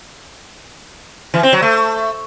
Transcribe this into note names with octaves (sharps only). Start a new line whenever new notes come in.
E3
C4
F#3
A3